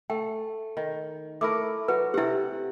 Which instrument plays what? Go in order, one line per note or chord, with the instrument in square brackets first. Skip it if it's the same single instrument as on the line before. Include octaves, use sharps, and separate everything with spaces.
[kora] A3 [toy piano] G5
[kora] D#3
[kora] A3 E4 A#4 [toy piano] D6
[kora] F#3 [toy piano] B4
[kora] C3 F#5 [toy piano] E4 G4